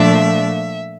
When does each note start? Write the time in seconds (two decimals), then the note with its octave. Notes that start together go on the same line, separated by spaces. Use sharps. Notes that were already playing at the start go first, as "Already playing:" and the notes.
Already playing: A#2 F3 A3 D4 E5